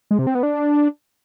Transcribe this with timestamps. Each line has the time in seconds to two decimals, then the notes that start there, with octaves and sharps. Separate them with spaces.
0.11 G#3
0.19 C3
0.27 C4
0.35 B3
0.43 D4